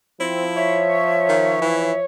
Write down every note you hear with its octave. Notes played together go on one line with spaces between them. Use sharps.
F3 C4 E4
C#5 E5
D#3
E3